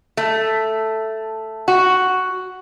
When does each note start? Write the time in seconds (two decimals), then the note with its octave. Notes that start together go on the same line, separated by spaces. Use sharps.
0.17 A3
1.68 F#4